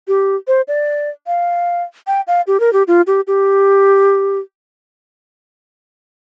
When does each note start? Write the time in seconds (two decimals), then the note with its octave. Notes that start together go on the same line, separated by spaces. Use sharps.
0.08 G4
0.48 C5
0.68 D5
1.27 F5
2.07 G5
2.27 F5
2.47 G4
2.60 A#4
2.73 G4
2.88 F4
3.07 G4
3.27 G4